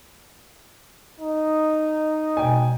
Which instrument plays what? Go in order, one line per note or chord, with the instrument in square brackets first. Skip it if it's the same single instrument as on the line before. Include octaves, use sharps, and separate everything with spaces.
[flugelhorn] D#4
[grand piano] E1 G5 G#5